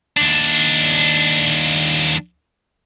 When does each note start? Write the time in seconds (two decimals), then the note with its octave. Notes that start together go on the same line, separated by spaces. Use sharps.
0.17 D#2 D4